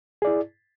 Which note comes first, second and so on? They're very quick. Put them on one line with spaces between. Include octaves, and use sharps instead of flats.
G#4 D5 E4